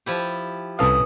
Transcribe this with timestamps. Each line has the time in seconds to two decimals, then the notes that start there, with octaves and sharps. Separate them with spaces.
0.06 F3 E4 G4
0.79 C2 C#4 A4 B4 F5 D#6